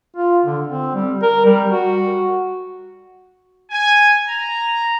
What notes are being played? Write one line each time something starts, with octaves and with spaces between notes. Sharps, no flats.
F4
D3
C4
G3
A#4
G3
F#4
G#5
A#5